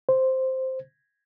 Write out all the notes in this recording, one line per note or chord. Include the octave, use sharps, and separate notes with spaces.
C5